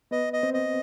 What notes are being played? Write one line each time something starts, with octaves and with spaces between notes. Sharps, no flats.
B3 B4 D#5
D#5
C4 C5
D#5